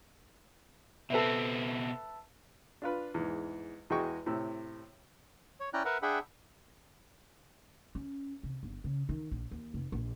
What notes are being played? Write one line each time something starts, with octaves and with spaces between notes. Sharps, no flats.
B2 C4 A4 B4 E5
D4 F4 B4
E2 G#2
E2 G#3 F#4 D#5 G5 C#6
A2 C3 E6
C#5
C#4 E4 D5 G5 A#5 F#6
A#4 B4 E5 F#5
D4 G#4 E5 F#5 G5 B5
C#4
C3
G1
C#3
D#3
A#1
D#2
F1
A#1